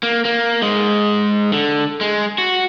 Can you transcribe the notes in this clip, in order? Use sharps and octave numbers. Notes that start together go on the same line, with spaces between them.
A#3
A#3
G#2 G#3
D3
G#3
F#4